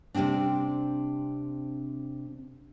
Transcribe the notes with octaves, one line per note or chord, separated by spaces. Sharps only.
C3 G3 A#3 C4 D4